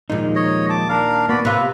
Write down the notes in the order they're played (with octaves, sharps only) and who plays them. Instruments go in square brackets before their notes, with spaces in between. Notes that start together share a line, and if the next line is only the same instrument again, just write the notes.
[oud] D#2 A#2 [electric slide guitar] F3 G#3 D#4
[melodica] C#5 D#5
A5 D6
D4 A#4 F5
[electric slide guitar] A#3 B3 [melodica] F#4 D5 B5
[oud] C3 F4 [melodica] B4 E5